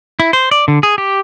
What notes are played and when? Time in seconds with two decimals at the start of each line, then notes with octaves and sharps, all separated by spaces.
0.20 E4
0.33 C5
0.51 D5
0.68 D3
0.83 G#4
0.98 G4